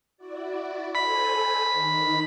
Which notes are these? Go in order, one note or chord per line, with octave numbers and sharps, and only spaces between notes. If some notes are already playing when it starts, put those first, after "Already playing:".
E4 F#4 D5
A4 C5 G#5 B5
D#3 D#4